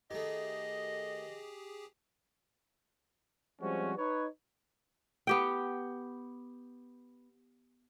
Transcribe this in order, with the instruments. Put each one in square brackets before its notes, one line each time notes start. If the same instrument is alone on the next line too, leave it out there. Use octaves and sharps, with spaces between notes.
[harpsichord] D#3 A3 [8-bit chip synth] G4 G#4 [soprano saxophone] D#5
[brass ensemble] F3 G3 G#3 C4 C#4 F#4
D#4 B4 C#5
[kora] B3 G4 G5